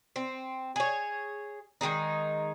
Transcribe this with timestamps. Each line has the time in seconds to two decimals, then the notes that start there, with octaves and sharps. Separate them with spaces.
0.16 C4
0.76 G#4 C#5
1.81 D#3 E3 G#3 D#4